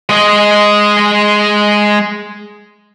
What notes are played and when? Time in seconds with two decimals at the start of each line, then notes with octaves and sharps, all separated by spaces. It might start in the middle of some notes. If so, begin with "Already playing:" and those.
0.09 G#3 D#5